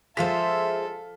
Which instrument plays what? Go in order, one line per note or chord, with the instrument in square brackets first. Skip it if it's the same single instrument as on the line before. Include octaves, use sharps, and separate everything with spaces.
[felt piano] F3 F5 B6 [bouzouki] G#3 F4 C5 [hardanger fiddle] A4 [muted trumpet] E5